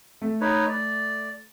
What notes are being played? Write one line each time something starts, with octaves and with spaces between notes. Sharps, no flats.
A3
D#4 B4 C#5
D5